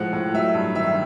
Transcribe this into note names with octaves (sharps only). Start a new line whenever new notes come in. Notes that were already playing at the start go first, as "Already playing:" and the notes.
Already playing: A2 F3 G#3 F#5
A2
F#3 E5
G2
D#3 E5